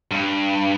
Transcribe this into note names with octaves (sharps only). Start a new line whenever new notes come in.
G2